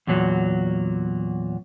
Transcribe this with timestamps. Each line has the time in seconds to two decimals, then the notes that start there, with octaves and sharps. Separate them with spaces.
0.07 E2 A#2 F#3